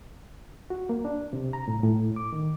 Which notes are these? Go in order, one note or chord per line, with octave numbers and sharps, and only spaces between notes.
F#4
A#3
D4
C3
A#5
A2
A2
D6
D#3